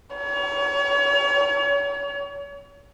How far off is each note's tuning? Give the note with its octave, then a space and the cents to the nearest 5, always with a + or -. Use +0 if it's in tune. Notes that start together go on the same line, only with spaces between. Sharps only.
C#5 +35